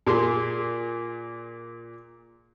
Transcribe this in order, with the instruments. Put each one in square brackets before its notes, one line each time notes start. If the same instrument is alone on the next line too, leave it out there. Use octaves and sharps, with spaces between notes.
[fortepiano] A#2 G#4 C6